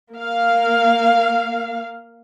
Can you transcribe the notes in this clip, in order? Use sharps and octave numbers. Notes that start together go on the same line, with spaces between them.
A#3 F5